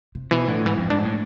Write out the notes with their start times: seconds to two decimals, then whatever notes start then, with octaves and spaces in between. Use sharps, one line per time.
0.15 C3
0.31 B2 E3
0.48 A2 D3
0.65 G#2 E3
0.77 F2 C4
0.90 G#2 D4
1.03 A2 B3